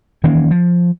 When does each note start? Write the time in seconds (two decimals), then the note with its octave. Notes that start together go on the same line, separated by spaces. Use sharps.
0.24 D#3 E3 A#3 C#4
0.51 F3